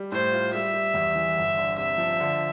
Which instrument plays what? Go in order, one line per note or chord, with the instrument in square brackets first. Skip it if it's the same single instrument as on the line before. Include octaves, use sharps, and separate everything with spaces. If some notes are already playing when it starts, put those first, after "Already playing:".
Already playing: [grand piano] G3
[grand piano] A2 [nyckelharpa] C5
[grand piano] F4
[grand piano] G3 [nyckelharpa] E5
[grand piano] G3
E2
E3
G1
D3
[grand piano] C3 [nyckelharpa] E5
[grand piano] F3
D3